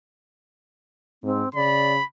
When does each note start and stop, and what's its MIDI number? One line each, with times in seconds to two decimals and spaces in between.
1.23 1.43 44
1.23 1.49 60
1.55 1.98 49
1.55 1.93 74
1.55 2.04 83